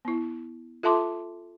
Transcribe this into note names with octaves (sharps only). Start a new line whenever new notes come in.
B3 E4
F4 A4 E5 A5 C6 D6